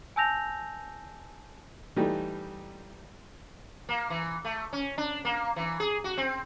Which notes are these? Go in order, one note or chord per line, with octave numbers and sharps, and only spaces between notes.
G#5 A5 E6 G6 A#6 F7
E3 G3 A3 D#4 G4
A#3
E3
A3
C#4
D4
A#3
E3
G#4
F#4
C4